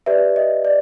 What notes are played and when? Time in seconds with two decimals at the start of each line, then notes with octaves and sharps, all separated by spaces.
0.06 G4 B4 D5 E5
0.36 D#5
0.65 D5